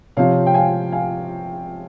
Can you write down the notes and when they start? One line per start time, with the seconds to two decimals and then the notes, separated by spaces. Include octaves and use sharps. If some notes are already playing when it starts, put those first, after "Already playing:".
0.17 C3 F3 C4 C#5 F5
0.46 G5
0.54 F5 G#5
0.92 F5 G#5